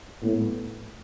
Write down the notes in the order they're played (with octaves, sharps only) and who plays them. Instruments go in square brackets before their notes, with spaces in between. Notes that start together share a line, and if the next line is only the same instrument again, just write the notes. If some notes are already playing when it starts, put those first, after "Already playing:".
[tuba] A2 [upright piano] B3
[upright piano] A2